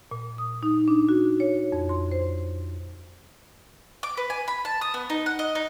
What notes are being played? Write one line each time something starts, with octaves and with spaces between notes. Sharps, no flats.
A#2
D#6
D#4
D4
F#4
C#5
F2
C6
C5
D6
B4
G#5
B5
A5
D#6
B3
D#4
F#5
D#5
D#4